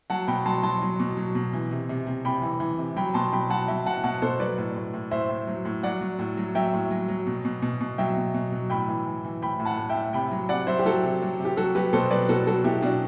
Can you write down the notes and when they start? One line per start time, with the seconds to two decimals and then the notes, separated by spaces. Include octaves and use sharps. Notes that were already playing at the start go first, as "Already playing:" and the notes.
0.10 F#3 F#5 A5
0.27 B2 G5 B5
0.46 F#3 A5 C6
0.63 F#3 A5 C6
0.81 F#3
1.00 B2
1.17 F#3
1.35 B2
1.53 E3
1.71 C3
1.89 C3
2.07 C3
2.25 C3 G5 B5
2.42 E3
2.60 E3
2.78 C3
2.96 F#3 G5 B5
3.14 B2 A5 C6
3.32 F#3 G5 B5
3.50 F#3 F#5 A5
3.68 F#3 E5 G5
3.86 B2 F#5 A5
4.04 B2 F#5 A5
4.22 B2 A4 C5
4.40 F#3 B4 D5
4.58 A2
4.76 A2
4.94 A2
5.11 A2 C5 E5
5.29 A2
5.47 F#3
5.65 A2
5.83 F#3 D5 F#5
6.01 F#3
6.19 A2
6.37 F#3
6.55 F#3 E5 G5
6.73 A2
6.91 F#3
7.08 F#3
7.27 B2
7.45 B2
7.62 B2
7.80 B2
7.98 F#3 E5 G5
8.17 B2
8.34 B2
8.52 F#3
8.70 A2 G5 B5
8.88 E3
9.06 E3
9.24 E3
9.42 A2 G5 B5
9.60 A2
9.65 F#5 A5
9.78 A2
9.89 E5 G5
9.95 A2
10.13 C3 G5 B5
10.31 F#3
10.49 C3 D5 F#5
10.67 F#3 C5 E5
10.79 G4
10.85 F#3 F#4 A4
11.04 C3
11.22 F#3
11.40 C3
11.45 G4
11.57 F#3 F#4 A4
11.75 F#3 G4 B4
11.93 B2 A4 C5
12.10 F#3 B4 D5
12.29 B2 F#4 A4
12.47 F#3 F#4 A4
12.64 B2 E4 G4
12.82 B2 D4 F#4